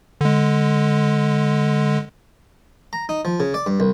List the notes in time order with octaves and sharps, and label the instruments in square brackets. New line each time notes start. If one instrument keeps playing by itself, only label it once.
[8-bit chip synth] D3 G#3
[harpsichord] A#5
D#4
F3
C#3
D5
G2
C2